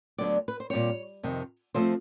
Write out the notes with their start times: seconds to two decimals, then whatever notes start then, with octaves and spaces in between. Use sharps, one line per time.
0.18 D2 D3 F#3 B3 D5
0.48 B4
0.60 C5
0.70 A#2 G3 C4 C#5
1.23 F2 C3 D#3
1.74 C#3 F3 A3 C4 C5